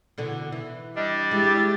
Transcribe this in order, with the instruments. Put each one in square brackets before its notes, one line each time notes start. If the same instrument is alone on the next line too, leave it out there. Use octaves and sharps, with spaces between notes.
[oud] B2 D3 E3
E3
[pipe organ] G3 D4 [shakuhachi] D#5
[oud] G#3 [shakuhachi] E4 [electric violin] G4 A6